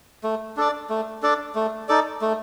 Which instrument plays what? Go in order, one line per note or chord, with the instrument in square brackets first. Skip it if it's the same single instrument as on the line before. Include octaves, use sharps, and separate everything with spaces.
[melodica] A3
D4 A4 D5
A3
D4 A4 D5
A3
D#4 A4 D5
A3